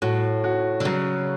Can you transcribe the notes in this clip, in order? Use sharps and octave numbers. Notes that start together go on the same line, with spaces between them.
A2 F#4
F#4
D3
C#3 F#3